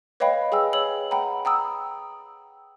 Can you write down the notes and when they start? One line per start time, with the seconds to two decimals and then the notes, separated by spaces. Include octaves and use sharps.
0.20 B4 C#5 D#5 F5 G5 B5
0.52 G#4 G5 G#5 E6
0.73 C#5 E6 F#7
1.11 F#5 G5 A#5 B5
1.45 G5 A#5 D#6 E6